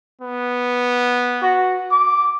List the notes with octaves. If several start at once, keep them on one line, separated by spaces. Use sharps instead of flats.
B3
F#4
D6